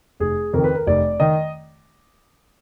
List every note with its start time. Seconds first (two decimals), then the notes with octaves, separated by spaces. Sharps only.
0.20 F1 G#4
0.53 F2 D#3 A#4
0.64 B4
0.74 A#4
0.87 F1 D5
1.20 D#3 D#5